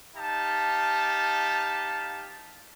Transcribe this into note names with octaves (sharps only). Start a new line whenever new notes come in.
D#4 G4 F5 A5